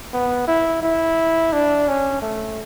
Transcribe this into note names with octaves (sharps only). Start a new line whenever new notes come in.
B3
E4
E4
D4
C#4
A3